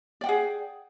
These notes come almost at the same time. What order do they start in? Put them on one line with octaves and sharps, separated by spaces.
D5 G5 F#5 G#4